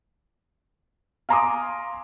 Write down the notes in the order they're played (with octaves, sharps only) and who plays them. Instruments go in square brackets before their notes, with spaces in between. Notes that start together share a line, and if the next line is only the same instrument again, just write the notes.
[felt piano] F5 G#5 A#5 C6 D6 D#6